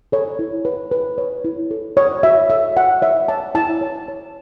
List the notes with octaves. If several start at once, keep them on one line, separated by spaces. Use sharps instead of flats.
A4 C#5
E4
B4
B4
C#5
E4
A4
C#5
F#4 E5
A4 E5
F#4 F#5
C#5 E5
C#5 A5
E4 A5
C#5
C#5